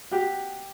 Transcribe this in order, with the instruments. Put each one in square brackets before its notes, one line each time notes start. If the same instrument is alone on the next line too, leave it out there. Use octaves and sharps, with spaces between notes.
[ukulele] F#4 [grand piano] G4